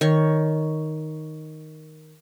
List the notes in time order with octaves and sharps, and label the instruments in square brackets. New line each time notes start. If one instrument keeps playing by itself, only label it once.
[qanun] D#3 C#5